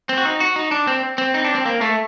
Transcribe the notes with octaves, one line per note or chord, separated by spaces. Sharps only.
C4
F#4
D#4
F#4
D#4
D4
C4
C4
D#4
D4
C4
A#3
A3